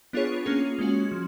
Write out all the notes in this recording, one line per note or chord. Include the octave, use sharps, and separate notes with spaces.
B3 D4 F4 G#4 C#5
A#3 C#4 F4 G#4
G#3 C#4 F#4
F3